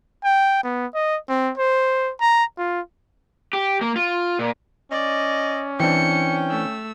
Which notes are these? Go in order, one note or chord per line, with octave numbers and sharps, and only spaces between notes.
G5
B3
D#5
C4
C5
A#5
F4
G4
A#3
F4
A#2
C#4 D5 D#5
E3 C4 D4 G5 C#7
A3 E6